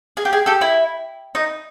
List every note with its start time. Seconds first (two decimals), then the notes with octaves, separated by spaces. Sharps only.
0.17 G#4
0.25 G4
0.33 G#4
0.46 G4 A4
0.61 E4
1.35 D#4